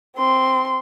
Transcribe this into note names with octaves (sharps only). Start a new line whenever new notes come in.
C4 C6